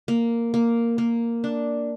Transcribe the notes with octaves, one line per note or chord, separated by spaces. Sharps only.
A#3
A#3
A#3
D4